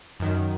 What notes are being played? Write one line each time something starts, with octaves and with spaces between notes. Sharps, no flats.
F#2 D#3